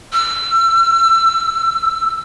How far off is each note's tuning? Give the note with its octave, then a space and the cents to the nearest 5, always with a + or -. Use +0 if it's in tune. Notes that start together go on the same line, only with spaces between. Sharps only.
E6 +30